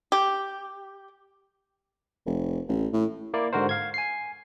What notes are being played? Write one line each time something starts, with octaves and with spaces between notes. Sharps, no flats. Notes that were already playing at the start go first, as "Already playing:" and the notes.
G4
F1
A1
A2
A#3 E4 D5
G#2 D3 F#4 A#4 C5
F5 G#6
G#5 C7